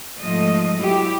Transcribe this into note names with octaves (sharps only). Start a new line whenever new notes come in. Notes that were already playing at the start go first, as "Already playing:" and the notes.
G#2 F3 A3 D#5
F#3 E4 G4